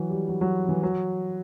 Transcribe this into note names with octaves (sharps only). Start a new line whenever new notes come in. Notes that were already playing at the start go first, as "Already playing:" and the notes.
Already playing: E3 F#3
G3
F#3
F#3
E3
F#3